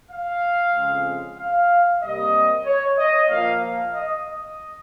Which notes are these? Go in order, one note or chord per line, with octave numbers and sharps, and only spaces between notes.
F5
F2 C#3 G#3
F5
C3 G3 A#3 D#5
C#5
D#5
A#2 F3 A#3 F5
F5
D#5
D#5